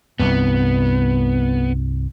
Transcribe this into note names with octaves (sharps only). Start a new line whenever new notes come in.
C2 G2 B3